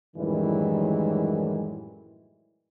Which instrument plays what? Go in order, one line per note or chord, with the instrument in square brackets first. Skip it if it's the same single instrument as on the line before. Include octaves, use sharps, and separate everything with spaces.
[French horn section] F#2 A2 D#3 E3 G3 G#3